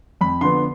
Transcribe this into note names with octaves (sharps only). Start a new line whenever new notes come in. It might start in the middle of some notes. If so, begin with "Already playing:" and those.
F2 B5
D3 F3 B3 C6